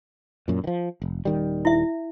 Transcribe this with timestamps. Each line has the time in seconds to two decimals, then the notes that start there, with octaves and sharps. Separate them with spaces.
0.48 F#2 A#2
0.64 D#3 F3
1.02 F1
1.25 D#1 D#3 G3
1.65 E4 E5